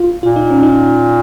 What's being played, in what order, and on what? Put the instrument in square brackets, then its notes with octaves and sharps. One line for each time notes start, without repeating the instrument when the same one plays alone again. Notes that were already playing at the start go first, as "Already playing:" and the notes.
Already playing: [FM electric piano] F4
[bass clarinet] A#2 [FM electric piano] F4
[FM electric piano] D#4
C#4
D#4